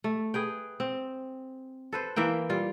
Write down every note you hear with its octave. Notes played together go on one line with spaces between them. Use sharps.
A3
G#4 B4 G5
C4
A4 B4 C5
E3 A#3 E5 G5
G3 F4